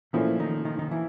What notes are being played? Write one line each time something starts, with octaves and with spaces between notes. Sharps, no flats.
A#2 E3 F3 A3 C#4 E4
D#3 D#4
D#3 D#4
D#3 D#4
E3 E4